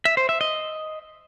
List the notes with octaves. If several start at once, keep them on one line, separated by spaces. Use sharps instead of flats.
E5
C5
E5
D#5